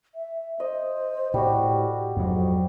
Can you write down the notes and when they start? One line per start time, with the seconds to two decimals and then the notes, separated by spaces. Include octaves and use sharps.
0.15 E5
0.60 C5 D#5
1.34 A2 G3 F#4 G4
2.17 F2 G#2 F#3